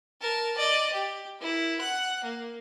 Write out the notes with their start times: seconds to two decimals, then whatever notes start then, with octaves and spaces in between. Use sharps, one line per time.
0.21 A#4 A5
0.57 D5 D#5
0.93 G4
1.40 E4 A#4
1.79 F#5 F#6
2.24 A#3